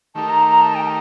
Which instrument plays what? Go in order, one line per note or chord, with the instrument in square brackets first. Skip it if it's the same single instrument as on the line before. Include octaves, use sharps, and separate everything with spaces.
[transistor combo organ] D#3 A3 D#4 G4 A#4 [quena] A5
[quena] A#5
A#5
A5
G5